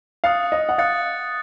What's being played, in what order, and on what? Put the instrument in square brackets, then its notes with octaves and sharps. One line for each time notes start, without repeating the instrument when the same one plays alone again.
[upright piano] F5 [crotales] D#6 F#6 A6 C#7
[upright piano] D#5
F#5
[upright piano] F5 [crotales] D#6 F#6 A6 C#7